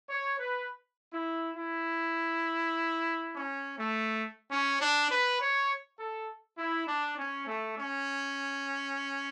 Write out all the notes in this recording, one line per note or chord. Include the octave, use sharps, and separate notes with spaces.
C#5
B4
E4
E4
C#4
A3
C#4
D4
B4
C#5
A4
E4
D4
C#4
A3
C#4